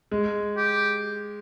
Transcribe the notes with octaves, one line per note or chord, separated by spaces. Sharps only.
G#3
G4